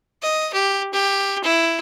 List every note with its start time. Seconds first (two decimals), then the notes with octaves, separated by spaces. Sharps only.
0.22 D#5
0.53 G4
0.93 G4
1.44 E4